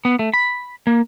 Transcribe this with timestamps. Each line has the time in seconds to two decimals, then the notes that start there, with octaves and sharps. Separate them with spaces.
0.05 B3
0.19 A3
0.34 B5
0.87 A#3